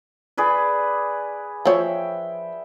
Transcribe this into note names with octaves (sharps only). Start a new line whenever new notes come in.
G#4 B4 D5
F3 C#5 E5 G5